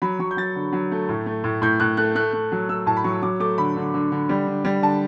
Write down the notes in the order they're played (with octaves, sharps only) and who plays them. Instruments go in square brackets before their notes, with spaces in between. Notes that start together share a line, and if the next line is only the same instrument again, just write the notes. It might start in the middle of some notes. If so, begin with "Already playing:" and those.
[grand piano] F#3 B5
F#3 C#6
G6
F#3 A6
D3
F#3
A3
A2
A3
A2
A2 G6
A2 F#6
A3 F#6
A3 F#6
A3
F#3
A3 E6
A2 A5
B5
F#3 C#6
F#3 D6
A3 D6
D3 B5
D3
D3
D3
G3
D3
G3
D3 A5